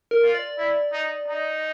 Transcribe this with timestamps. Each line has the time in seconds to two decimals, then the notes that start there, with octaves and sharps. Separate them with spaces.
0.11 A#4
0.23 F4
0.34 D5
0.58 E4
0.92 D#4
1.28 D#4